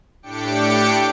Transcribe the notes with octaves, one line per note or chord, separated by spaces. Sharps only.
A2 D4 G4 G5 D6 C#7